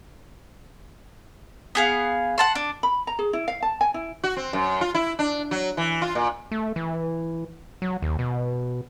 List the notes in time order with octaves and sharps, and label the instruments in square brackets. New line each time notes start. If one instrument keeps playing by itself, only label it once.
[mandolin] B3 G#4 F5
F#5 A5 C6
D4
[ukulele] B5
A#5
G#4
E4
F5
A5
G#5
E4
[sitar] F#4
C4
F#2
F4
E4
D4
F#3
E3
F4
A#2
[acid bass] A3
E3
F#3
D#2
B2